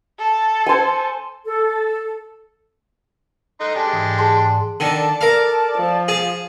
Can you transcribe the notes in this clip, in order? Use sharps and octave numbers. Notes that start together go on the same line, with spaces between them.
A4
C5 G#5
A4
D#4 A4 C6 F#6
G#3 D4 G4 A5
G#2 E3 D#6
G#4 A5 C6
G#2
D3 D#3 A4 D5 A5
A#4 F5
F3
G#4 A5